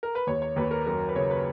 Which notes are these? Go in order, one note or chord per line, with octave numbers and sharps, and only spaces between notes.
A#4
B4
D#2 C#5
C#5
D#2 B4
A#4
F#2 A#4
B4
C#3 C#5
B4